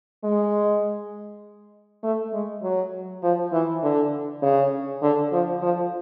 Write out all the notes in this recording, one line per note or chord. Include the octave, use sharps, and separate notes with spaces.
G#3
A3
G#3
F#3
F3
E3
D3
C#3
D3
F3
F3